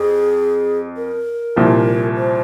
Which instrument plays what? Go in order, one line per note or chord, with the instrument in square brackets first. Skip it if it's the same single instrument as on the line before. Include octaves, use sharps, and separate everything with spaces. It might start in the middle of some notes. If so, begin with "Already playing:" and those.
Already playing: [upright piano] F2 [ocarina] G#4
[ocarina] A#4
[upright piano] C2 A#2 F3
[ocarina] C5